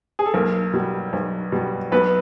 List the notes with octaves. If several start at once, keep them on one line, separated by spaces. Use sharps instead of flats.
G#4
A4
B1 A#3 A#4
B2 G3
B1
B2 G3
B1 B3 B4